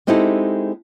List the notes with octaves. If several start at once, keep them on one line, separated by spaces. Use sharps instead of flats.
G#3 C4 D#4 E4 G4 A4